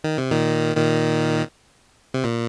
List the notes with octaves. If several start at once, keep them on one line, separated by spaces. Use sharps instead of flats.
D#3
C3
A#2 D#3
A#2 D#3
C3
A#2